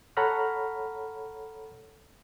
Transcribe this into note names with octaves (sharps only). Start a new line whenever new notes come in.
A4 C#5 F#5 A#5 B5 F6